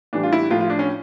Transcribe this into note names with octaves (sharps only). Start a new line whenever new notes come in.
A2 E3 G3 D4
F4
E4
A2 F3 F4
F4
D4
C#4